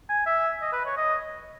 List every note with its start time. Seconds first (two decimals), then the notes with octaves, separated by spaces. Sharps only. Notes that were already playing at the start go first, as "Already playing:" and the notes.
0.09 G#5
0.26 E5
0.62 D#5
0.73 B4
0.85 C#5
0.97 D#5